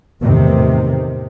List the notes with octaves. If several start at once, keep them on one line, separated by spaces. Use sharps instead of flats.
E2 A2 C3 D#3